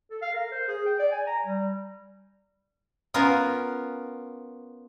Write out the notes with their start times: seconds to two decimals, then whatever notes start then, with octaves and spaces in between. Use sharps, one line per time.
0.11 A4
0.22 F5
0.34 A#4
0.52 C5
0.68 G#4
0.86 G5
0.99 D5
1.12 G#5
1.27 A#5
1.46 G3
3.14 B3 C#4 F4 A#4